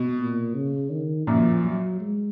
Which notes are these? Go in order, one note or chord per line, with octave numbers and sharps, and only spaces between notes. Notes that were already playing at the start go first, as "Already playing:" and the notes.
Already playing: B2
A#2
C#3
D#3
F#2 A#2 F3
F#3
G#3